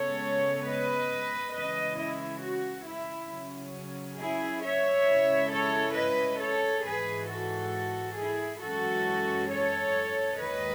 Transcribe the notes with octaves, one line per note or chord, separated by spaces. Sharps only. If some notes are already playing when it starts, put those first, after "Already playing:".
Already playing: C#3 G#3 B3 A4 C#5
B4 D#5
C#3 E3 G#3 C#4 B4 D#5
E4
F#4
E4
C#3 F#3 C#4
E4 G#4
C#5 E5
C#3 G#3 C#4 E4
A4 C#5
B4 D#5
A4 C#5
G#2 E3 G#3 G#4 B4
F#4 A4
E4 G#4
F#2 E3 G#3 C#4 F#4 A4
A4 C#5
D#2 D#3 G#3 B4 D#5